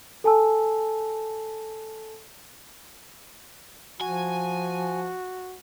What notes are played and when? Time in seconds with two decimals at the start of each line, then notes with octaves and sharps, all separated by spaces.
0.24 A4 G#5 A5 E6
4.01 F3 F#4 G#5